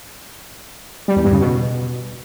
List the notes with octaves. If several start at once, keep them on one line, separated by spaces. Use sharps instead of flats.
G3
E2
G2
C#3
B2